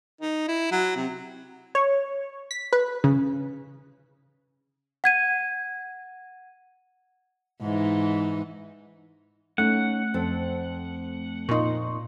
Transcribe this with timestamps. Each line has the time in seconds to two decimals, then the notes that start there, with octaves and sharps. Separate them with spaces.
0.21 D#4
0.48 E4
0.71 F#3
0.96 C3
1.75 C#5
2.51 B6
2.73 B4
3.04 C#3
5.04 F#5 G#6 D#7
7.61 G#2 E3 D#4
9.58 A3 C#4 D#4 F#5
10.14 F2 C4 A4
11.49 A#2 D#4 C6 C#6